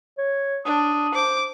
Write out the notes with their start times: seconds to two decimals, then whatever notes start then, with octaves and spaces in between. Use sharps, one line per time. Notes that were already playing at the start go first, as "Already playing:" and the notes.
0.18 C#5
0.65 D4 D#6
1.14 C5 D6